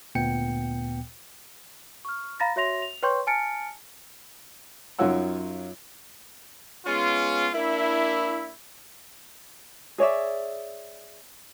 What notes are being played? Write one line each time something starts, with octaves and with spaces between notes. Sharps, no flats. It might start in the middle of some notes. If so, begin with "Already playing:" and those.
D2 A#2 B3 G5 C#7
C#6 F6
F5 A#5 B5 A6 A#6
F#4 C#5 E5 C6 A#6 F7
F7
B4 C#5 G5 C6 C#6 G6
G#5 A5 F6 A6 C#7 D7
F#2 D#4 F4 C#5 F#5 E6
G#3 B3 C#4 F4
A#3 D4 E4
G#4 C#5 D5 E5